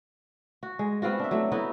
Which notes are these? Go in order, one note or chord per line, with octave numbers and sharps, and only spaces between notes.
F#4
G#3
B3 C4 F4 F#4
D4 E5
F#3 A3
B3 D#4 E4 F#4